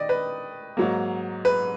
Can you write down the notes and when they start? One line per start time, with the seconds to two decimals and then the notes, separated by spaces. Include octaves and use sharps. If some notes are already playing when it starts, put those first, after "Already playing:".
Already playing: D#3 D5 D#5
0.09 B4
0.77 G#2 F#3 A#3
1.45 B4